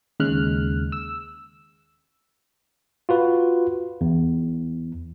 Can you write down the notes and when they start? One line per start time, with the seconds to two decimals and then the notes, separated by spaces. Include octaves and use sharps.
0.20 D#2 C#3 G#3 F6 F#6
0.92 E6
3.09 F4 F#4 B4
4.01 E2